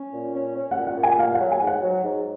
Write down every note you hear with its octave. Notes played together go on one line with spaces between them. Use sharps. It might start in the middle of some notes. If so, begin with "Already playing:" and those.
Already playing: C#4
A#2
C#4
C#4
F#5
A#2
F#5
A#2
G#5
A#3 F5
F5
F#5
F#3
G#5
G#2
F#5
F#3
G#2